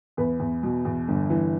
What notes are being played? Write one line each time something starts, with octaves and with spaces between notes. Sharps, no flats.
E2 B4
E2
B2
E2
G1
E3